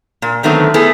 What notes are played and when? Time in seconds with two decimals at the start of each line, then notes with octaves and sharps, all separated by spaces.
0.22 A#2
0.43 D3 D#3 F#3 A3 B3 C4
0.74 A3 B3 E4 G#4 A4